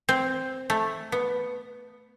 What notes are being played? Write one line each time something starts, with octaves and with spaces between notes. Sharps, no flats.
C4
A3
B3